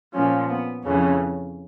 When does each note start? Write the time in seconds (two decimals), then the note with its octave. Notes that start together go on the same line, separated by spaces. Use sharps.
0.13 A#2 F3 C#4
0.49 B3
0.83 F2 C#3 E3 C#4